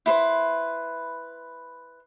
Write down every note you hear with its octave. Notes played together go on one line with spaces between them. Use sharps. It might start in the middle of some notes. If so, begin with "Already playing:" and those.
E4 B4 C5